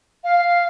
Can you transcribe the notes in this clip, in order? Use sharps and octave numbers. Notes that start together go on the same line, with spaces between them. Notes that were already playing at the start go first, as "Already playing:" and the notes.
F5